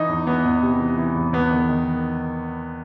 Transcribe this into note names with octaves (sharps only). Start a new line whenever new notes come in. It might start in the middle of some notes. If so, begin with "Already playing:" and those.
Already playing: E3 D#4
E2
E3 B3
E2
C3
E3
E3
E2
E2 B3
D#3
D#3